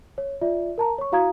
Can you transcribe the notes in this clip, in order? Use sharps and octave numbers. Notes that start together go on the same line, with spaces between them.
C#5
F4 D5 E5
A#4 A5 A#5
C#5 C#6
E4 F#4 F5 A#5 D#6 G#6